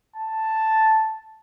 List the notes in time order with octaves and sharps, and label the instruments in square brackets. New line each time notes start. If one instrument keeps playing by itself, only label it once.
[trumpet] A5